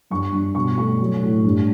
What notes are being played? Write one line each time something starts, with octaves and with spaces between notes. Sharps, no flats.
G2 C#6
G2
B2 C#6
A3 C#6
F#3
A2
G2